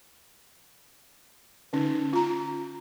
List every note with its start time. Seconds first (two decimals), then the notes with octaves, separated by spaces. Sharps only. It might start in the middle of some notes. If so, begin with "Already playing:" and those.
1.73 D3 C#4 D#4
2.13 F4 A#5